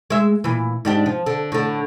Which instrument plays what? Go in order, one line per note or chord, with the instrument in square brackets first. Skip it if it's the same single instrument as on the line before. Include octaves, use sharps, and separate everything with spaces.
[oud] G#3 E5
A#2 E3
G#2 D4 G4
F3
D3
A2 D3